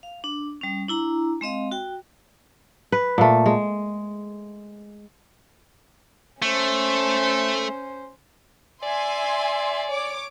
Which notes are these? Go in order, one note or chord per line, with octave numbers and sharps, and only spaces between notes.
F5
D4
G3 C#4
D4 E4 A#5
G#3 C4 D#5 F5
F#4 G5
B4
A#2 A3
G#3
A3 C#4 C5
D5 E5 G#5 C6
C#5 D6